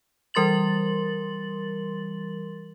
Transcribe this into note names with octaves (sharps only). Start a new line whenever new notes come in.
E3 G3 A#4 C6 A6 F#7